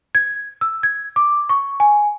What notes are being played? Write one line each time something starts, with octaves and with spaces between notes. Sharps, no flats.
G#6
E6
G#6
D6
C#6
G#5